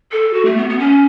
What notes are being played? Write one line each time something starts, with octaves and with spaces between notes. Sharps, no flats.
A4
F#4
A3
B3
B3
C#4